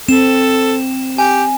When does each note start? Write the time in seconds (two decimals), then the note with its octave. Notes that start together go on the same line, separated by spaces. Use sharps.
0.09 C4 A4 E7
1.18 G4 G#5